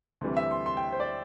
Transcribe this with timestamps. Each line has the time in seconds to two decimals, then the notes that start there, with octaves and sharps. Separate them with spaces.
0.21 D2 C3 E3 G3
0.37 E5
0.51 C6
0.66 C6
0.77 G5
0.92 C5
1.00 D5